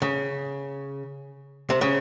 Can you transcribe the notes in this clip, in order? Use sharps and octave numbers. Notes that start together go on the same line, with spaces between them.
C#3
C3
C#3